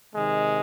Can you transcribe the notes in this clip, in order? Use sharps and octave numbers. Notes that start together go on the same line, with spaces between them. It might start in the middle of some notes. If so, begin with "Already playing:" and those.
C3 D#3 G#3